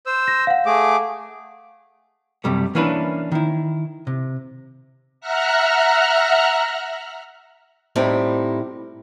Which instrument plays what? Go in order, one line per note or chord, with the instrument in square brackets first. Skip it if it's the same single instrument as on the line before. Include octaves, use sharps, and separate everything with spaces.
[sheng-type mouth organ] C5 E6
[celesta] A#6
F5 F#5
[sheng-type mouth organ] A3 G#4 D6
[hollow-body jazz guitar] F#2 C3 G3 A3
E3 A#3 C#4 D4 E4 B4
D#3 E4
C3
[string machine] E5 F#5 A#5 F6 F#6
[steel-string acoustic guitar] A2 G3 C4 D#4 E4